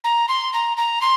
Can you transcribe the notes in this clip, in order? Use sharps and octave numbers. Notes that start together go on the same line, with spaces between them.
A#5
C6
A#5
A#5
C6